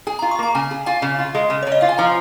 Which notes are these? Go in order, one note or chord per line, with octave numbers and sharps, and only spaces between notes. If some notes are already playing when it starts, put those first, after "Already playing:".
G#4 G#5
A#5
F4
C#6
A#3 A#5
C#3 G#5
G#4
F4 G#5
C#3
F4
G#3
C#3
C#5
C#3
D#5
F4 F5
G#5
F3 A#5